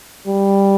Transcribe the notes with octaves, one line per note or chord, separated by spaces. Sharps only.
G3